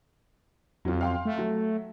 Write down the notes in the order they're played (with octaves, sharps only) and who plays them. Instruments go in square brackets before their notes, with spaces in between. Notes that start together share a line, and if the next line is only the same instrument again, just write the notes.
[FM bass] F2 [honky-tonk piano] F#3 F4
[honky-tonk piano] F5 G5 C6
[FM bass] A3
[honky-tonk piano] F#3